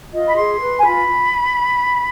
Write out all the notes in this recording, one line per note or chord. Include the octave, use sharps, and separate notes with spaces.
F4 D#5
B5
G#4 C6
B4
G#5
F4 B5